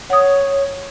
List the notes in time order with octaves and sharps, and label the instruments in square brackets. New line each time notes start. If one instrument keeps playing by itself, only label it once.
[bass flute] C#5 [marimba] F#5 D#6